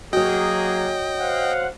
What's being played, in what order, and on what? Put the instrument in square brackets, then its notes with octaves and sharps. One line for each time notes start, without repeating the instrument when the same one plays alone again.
[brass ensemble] F#3 A#3 G#4 [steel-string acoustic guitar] F#4 C#5 [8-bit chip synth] D#5 G5
[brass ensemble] C5 F5 F#5